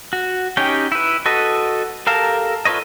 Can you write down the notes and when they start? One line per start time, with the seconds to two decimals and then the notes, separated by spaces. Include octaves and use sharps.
0.13 F#4
0.57 C#4 D#4 G4 C#5 G5
0.92 E4 B4
1.26 F#4 A4 B4 D#5
2.07 G4 A4 A#4 F5 A5
2.65 F4 A4 B4 C#5 D#5